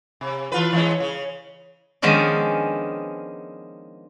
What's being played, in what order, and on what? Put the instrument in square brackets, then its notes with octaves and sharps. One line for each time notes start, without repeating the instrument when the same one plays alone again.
[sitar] C3
E3 F4 B4
E3 G#3 C#4
C#3
[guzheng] D#3 F3 G#3 B3 C#4 D4